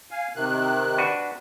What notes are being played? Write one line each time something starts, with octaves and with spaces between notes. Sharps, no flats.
F5 G#5
C3 D#3 F#6
D4 F#4 B4